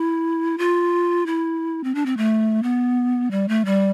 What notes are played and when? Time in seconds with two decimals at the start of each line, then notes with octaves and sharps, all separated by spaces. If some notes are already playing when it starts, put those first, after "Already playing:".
Already playing: E4
0.58 F4
1.26 E4
1.84 C4
1.95 D4
2.06 C4
2.17 A3
2.63 B3
3.31 G3
3.49 A3
3.65 G3